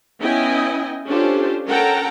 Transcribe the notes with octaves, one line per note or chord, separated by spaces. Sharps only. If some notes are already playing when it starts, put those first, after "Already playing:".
B3 C#4 E4 D#5 G5 G#5
C#4 D4 F4 G4 A4 C5
C#4 A4 A#4 F#5 G5 A#5